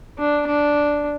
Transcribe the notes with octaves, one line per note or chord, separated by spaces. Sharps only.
D4
D4